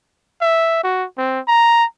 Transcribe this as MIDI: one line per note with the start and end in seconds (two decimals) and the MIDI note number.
0.41 0.82 76
0.83 1.05 66
1.18 1.40 60
1.48 1.84 82